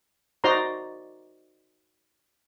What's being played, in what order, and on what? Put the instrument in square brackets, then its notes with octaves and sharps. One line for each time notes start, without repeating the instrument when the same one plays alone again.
[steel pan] D#4 F#4 C5 D5 A#5 C6